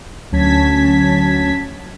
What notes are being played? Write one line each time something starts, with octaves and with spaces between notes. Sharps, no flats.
D2 F#3 C#4 A5 G#6 B6